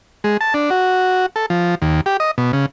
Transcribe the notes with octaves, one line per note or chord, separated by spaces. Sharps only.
G#3
A5
D4
F#4
A4
F3
D#2
G4
D#5
B2
C#3